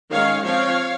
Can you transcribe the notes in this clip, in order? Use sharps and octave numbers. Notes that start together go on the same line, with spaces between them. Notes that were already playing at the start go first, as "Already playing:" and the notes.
D#3 G#3 C#4 C#5 F5
F3 C4 C#5 F5